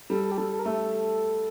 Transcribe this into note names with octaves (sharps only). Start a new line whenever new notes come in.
G3 A4
A4
G4
G3 A4
A4
A#4
A3 A4